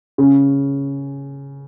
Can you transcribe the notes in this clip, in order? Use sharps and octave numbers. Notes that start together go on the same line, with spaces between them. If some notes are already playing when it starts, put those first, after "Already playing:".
C#3